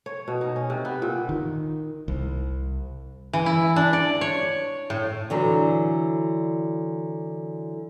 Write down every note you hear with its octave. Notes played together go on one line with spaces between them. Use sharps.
C#5
B2
D#4
C#4
C3
B3
A#2
D#3
C2
E3
E4
D4
D5
C#5
A2
D3 E3 F#3